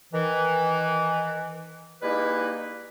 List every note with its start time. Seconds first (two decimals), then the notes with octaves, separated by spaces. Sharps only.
0.13 D#3 E3
2.02 G3 G#3 A#3 D#4 E4 B4